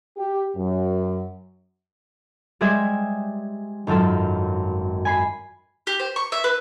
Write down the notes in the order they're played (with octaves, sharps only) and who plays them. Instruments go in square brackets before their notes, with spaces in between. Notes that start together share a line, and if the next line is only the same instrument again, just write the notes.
[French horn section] G4
F#2
[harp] G3 G#3 G#4 C5 E5 G#6
G#1 F#2 F4 A4
G#5 B5 C7
[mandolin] G4
C5
C#6
E5
B4